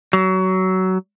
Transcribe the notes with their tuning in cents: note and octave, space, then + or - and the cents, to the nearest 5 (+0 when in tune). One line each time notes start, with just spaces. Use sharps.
F#3 +20